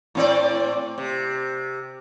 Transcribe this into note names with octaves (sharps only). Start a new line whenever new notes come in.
A2 C4 D5
C3